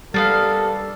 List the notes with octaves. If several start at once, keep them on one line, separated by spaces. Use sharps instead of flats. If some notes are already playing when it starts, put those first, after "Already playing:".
G3 A#3 B3 A4 F5 A6